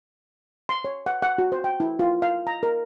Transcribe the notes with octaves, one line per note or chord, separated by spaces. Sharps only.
C6
C#5
F#5
F#5
F#4
C5
G5
E4
F4
F5
A#5
A#4